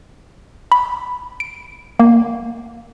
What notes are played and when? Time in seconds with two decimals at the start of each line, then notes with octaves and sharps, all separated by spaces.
0.72 B5
1.40 D7
1.99 A#3